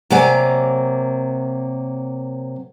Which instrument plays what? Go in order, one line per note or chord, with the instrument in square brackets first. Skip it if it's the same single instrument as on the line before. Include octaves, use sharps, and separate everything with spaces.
[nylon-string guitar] C3 F#3 A#3 D5 G#5